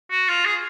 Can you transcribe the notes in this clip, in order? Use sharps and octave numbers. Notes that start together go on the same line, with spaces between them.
F#4
F4
G#4